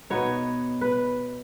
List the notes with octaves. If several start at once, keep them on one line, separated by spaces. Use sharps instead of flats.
B2 B3 D#4 C#5
B4